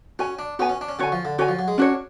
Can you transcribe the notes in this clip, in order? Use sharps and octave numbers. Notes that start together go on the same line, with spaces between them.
C#4 F#4 C#5 G#5
D4
B3 F#4 C#5 G#5
C#4
D4
C#4
D3 F#4 C#5 G#5
F3
D3
D3 F#4 C#5 G#5
F3
F#3
G#3
C#4 D4 F#4 C#5